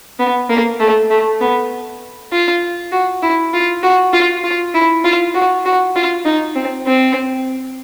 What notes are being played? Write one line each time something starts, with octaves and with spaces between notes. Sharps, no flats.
B3
A#3
A3
A3
B3
F4
F#4
E4
F4
F#4
F4
F4
E4
F4
F#4
F#4
F4
D#4
C4
C4